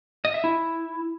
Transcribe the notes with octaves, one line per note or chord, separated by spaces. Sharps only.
D#5
E5
E4